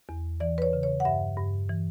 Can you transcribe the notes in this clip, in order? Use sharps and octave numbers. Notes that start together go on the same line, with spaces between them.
E2
E3 D5
B4
C#5
C#3
C#5
F#5
G2 E5
G2
E3